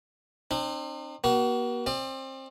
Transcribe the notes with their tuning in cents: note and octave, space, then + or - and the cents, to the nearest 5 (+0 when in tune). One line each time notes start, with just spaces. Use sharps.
C4 +30 D#4 -45
A#3 +45 F#4 +35
C4 +30 D5 +45